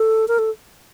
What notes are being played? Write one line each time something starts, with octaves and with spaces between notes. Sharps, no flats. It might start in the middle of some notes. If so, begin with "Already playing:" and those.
Already playing: A4
A#4
A4